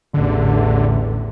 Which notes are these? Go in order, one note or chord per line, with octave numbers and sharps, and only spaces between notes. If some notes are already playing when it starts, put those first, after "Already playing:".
A1 E2 D3